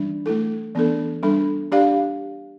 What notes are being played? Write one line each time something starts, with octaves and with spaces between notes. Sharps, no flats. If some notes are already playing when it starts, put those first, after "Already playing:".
Already playing: E3 G3 D4
A3 E4 A4
E3 B3 D4 A4
G3 D4 A4
D4 G4 D5 F5